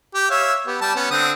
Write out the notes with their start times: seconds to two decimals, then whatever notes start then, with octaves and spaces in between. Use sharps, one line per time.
0.14 G4
0.30 C#5 E5 F5
0.67 B3 G4
0.82 G3 A5
0.95 B3 C#4
1.11 D3 C4 D#6